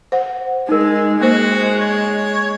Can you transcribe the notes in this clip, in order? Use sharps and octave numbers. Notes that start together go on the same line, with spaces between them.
C5 F#5
G#3 D#4 A#4
G#3 A#3 F#4 C5
C#5